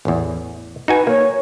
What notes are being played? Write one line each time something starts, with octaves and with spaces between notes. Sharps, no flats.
A1 E2
D#4 F#4 B4 G#5
A#3 C#5